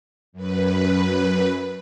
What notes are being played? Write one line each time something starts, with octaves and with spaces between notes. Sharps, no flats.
F#2 B4